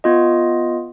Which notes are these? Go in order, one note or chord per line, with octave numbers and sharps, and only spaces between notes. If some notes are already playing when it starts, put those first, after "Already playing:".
B3 F4 D#5